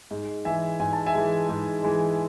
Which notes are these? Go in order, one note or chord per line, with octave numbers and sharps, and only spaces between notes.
G#2
E3 G#3 E5 G#5
G#2 G#5
A5
E5 G#5
E3 G#3
G#2
E3 G#3